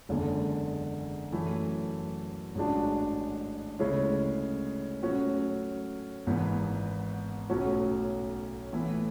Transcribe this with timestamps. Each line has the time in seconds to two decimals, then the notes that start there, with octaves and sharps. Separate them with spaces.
0.09 F#1 E2 D3 G#3
1.32 F#2 E3 A3 E4
2.55 A1 G#2 G#3 D4 F#4
3.79 D2 C#3 G#3 C#4 E4
5.03 A2 F#3 C#4 F#4
6.27 G#1 G#2 E3 B3
7.49 B1 A2 F#3 C#4 F#4
8.73 A2 E3 B3 E4